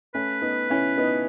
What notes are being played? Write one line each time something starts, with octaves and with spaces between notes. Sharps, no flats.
A3 C#4 B4
B3 D#4
C#4 E4
B3 D#4